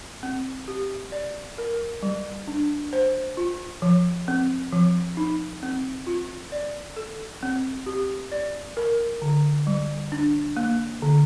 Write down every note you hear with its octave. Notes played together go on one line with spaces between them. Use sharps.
C4
G4
D5
A#4
G3
D4
C5
F4
F3
C4
F3
D#4
C4
F4
D5
A4
C4
G4
D5
A#4
D3
G3
D4
A#3
D3